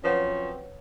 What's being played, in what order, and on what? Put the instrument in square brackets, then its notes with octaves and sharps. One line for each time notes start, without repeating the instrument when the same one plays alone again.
[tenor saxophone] F3 [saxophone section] F#3 C4 C#4 [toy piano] B4 C#5 F#5